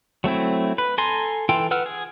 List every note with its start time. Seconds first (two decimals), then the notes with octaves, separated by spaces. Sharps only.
0.24 F#3 A3 C4 E4
0.78 B4
0.98 A4 G#5 A#5 C6
1.49 E3 F4 A4 G5
1.71 B4 F#5 E6 F6
1.86 G#4